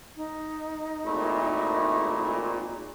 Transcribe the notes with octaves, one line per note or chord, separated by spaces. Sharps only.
D#4
G#1 A#2 A3 E4